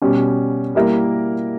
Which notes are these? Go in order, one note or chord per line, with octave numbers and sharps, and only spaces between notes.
B2 G3 C#4
G3 A#3 E4 A#4